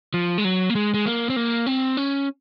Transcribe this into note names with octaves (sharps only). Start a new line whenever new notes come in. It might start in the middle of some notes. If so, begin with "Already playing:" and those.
F3
G#3
F#3
A#3
G#3
G#3
A#3
C4
A#3
C4
C#4